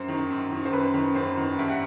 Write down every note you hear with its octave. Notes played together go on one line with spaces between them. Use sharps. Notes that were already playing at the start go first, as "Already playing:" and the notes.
Already playing: F#2 C5
D#3
F#2
D#3
C5
F#2 B4
D#3
F#2 C5
D#3
G2 E5
F#5